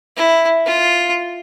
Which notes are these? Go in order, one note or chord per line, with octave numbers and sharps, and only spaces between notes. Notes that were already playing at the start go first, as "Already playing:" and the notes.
E4
F4